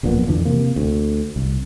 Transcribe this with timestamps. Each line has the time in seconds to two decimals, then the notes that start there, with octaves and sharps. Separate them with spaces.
0.03 D1 A#1 A#2 B3
0.28 F2 D3 E3
0.45 C3 A#3
0.76 D2
1.36 C2